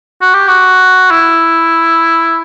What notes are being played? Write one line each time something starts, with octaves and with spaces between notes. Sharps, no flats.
F#4
G4
F#4
E4